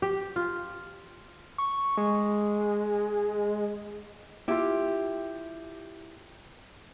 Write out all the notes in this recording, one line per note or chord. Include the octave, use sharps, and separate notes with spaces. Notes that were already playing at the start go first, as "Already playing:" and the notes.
G4
F4
C#6
G#3
E4 F4 G4